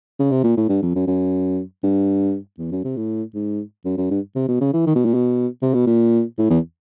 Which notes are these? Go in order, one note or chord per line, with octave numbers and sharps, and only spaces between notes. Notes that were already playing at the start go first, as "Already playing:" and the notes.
C#3
C3
A#2
A2
G2
F2
F#2
F#2
G2
E2
F#2
C3
A2
G#2
F#2
F#2
G2
C3
B2
C#3
E3
D#3
B2
A#2
B2
C3
B2
A#2
A2
E2